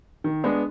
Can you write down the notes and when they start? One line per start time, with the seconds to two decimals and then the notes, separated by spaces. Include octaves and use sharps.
0.24 D#3
0.44 G#3 B3 D4